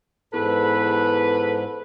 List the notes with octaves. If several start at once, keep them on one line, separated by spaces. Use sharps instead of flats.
E2 G#2 A4 B4